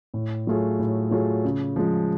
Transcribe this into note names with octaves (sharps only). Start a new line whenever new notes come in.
A2
F#3 A3 F4 G#4
A2
F#3 A3 F4 G#4
C#3
F3 G#3